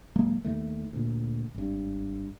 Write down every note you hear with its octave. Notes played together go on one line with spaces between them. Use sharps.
D1 F#3 G#3 A#3
D#2 D#3 A3
D2 A#2
G#1 G2